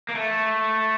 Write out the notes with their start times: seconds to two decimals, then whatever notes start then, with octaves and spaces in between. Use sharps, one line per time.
0.09 A#3
0.15 A3